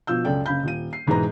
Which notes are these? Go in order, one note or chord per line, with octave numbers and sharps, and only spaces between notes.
B2 F3 F4 E6 G6
C#2 F#2 A4 D5 G5
F#1 C#3 F5 B5 G6
D#1 F4 D#7
C7
E1 G#2 E3 G#3 B4 A#5